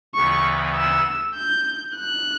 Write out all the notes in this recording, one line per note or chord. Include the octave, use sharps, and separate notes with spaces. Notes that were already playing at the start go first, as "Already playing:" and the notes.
D2 C#3 E3 B3 C#6
E6
G6
F#6